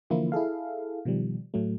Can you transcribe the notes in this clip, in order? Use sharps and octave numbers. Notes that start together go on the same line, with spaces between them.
D3 E3 F3 A#3 E4 F4
E4 G#4 A4 F5
B2 D#3 F3 G3
A2 F#3 A3